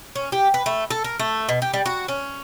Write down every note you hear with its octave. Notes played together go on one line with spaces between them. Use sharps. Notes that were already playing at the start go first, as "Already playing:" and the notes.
C#4
G4
B4
A3
A4
A#4
A3
B2
G4
G3
F#4
C#4